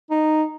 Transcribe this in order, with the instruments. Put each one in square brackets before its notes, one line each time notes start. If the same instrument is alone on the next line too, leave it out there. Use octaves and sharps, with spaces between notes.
[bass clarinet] D#4